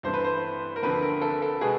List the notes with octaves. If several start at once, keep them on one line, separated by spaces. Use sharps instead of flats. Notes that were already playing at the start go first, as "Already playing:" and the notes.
G2 E3 A3 C4 C5
B4
C5
A#4
D2 D3 F3 A3 C4 B4
A#4
A4
A4
B2 G#3 B3 G#4